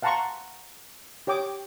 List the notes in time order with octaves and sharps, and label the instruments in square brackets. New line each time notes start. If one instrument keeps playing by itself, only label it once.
[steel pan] F5 F#5 A5 A#5 C6 C#6
G4 C#5 G5 D6 D#6